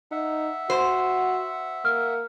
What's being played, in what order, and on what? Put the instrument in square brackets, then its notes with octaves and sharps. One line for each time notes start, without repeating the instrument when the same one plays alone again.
[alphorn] D#4 [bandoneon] E5 F#5
[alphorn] F#4 [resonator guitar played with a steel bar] C5
[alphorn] A#3 [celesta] F6